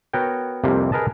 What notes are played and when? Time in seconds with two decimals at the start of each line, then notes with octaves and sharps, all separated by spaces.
0.13 B3 F#4 A#4 C#5 G5
0.64 C2 F2 C3 G3 A#3
0.92 G#4 A#4 B4 D#5 A5